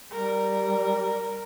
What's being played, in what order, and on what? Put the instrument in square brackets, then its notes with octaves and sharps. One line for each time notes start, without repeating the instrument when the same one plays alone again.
[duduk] G3 [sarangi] A#4